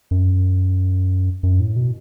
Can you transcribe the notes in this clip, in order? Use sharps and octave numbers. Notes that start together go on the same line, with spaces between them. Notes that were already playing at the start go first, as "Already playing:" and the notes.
F#2
F#2
A2
B2